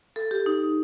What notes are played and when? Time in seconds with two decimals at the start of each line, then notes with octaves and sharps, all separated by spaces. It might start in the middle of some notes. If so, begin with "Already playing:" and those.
0.16 A4
0.31 G4
0.46 D#4